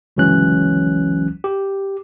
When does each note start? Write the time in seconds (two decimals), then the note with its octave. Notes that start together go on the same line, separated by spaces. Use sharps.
0.17 G1 C#2 E3 F#3 C#4 F#6
1.44 G4